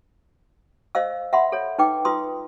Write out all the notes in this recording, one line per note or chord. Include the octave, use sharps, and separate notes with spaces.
C5 D#5 F5 E6
E5 F#5 B5 C6
A4 C#5
D#4 B4 G5 D6
F4 B4 C6 D#6